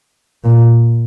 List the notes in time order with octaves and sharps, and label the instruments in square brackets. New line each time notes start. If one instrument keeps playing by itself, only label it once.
[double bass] A#2